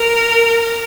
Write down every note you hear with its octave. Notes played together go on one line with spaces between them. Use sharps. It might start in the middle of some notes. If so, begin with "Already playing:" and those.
Already playing: A#4